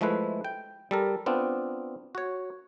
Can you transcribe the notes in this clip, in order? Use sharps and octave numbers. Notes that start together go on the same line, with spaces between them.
F3 G#3 A3 E4 B4
G5
G3 A4 A#4
B3 C4 D4 F4
F#4 C#5